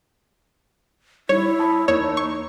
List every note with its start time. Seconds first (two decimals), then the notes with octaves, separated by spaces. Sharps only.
1.29 G3 D#4 E4 C#5
1.60 A5 B5 D#6
1.88 E2 A#3 D#4 C#5 E6
2.17 C#6